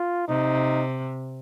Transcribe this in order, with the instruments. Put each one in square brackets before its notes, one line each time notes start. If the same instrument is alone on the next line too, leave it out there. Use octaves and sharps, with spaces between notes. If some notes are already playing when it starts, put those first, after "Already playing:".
Already playing: [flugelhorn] F4
[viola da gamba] C3 [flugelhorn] D#4